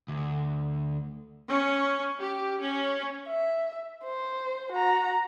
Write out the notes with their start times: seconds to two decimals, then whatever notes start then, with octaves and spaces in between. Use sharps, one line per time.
0.08 D2
1.50 C#4
2.20 G4
2.59 C#4
3.28 E5
4.04 C5
4.72 F#4 A#5